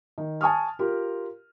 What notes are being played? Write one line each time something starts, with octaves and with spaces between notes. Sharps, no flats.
D#3
G#5 A5 C#6 D#6 F6
F4 G4 A#4